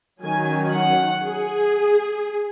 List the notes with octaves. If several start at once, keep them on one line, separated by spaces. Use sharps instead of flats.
D#3 F#3 C#4 G#5
F#5
G#4